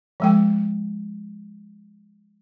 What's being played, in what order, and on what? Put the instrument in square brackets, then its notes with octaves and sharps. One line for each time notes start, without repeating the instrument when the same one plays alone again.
[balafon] F3 G#3 G5